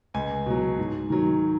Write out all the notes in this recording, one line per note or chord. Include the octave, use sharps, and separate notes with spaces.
C#2 G#5
B2 F#3
G#2
D#3 F#3